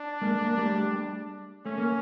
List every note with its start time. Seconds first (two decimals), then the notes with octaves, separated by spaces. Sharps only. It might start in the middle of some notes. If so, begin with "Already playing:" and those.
Already playing: D4
0.22 G#3 A#3
0.45 A#3
0.58 G3 A3
1.66 A3 C#4
1.78 A#3